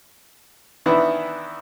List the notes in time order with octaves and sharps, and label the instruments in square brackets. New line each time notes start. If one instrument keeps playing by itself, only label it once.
[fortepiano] D#3 E3 B3 D4 E4